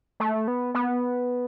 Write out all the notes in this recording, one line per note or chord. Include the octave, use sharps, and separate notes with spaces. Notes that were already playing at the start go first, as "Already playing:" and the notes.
A3
B3
B3